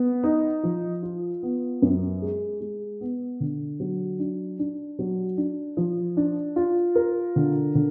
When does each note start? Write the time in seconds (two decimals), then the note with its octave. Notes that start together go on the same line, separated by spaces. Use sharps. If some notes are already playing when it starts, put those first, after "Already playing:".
Already playing: B3
0.23 D#4
0.63 F3
1.03 F4
1.43 B3
1.82 F#2
2.22 G#3
2.61 G#3
3.01 B3
3.40 D3
3.80 F#3
4.19 D4
4.59 D4
4.99 F#3
5.38 D4
5.77 F3
6.17 D4
6.56 F4
6.95 A#4
7.36 D3
7.75 D3